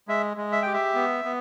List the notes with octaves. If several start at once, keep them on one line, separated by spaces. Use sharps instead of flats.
G#3 E5
G#3
E5
G4 G5
E5
B3
B3